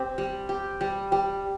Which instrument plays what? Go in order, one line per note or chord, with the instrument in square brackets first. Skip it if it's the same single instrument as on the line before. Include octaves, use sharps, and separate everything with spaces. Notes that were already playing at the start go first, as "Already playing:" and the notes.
Already playing: [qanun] C4 G4
G3
G4
G3
G3